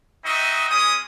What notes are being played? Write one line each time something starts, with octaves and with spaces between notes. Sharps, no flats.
C4 D#4 F#4 D#5 E5
G#3 C#4 D#6